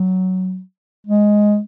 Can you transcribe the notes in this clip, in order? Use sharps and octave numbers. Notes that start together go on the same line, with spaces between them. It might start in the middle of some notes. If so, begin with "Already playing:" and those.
Already playing: F#3
G#3